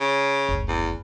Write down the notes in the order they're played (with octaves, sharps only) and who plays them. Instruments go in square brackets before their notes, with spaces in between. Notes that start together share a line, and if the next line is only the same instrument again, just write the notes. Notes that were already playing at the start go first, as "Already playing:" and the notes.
[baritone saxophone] C#3
[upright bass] F#1 D2
[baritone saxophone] E2